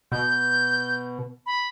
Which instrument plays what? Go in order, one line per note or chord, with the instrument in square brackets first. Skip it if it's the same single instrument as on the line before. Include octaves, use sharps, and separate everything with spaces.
[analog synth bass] B2 [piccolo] G6
[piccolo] B5